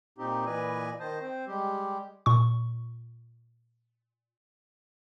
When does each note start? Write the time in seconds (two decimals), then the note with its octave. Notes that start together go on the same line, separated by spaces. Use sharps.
0.18 A#2 C4 D#4 G4
0.46 A#2 E3 B4 D5 D#5 G#5
1.00 D#3 C5 D#5 A5
1.21 C4 C5
1.48 G3 G#3 G4
2.26 A#2 C#6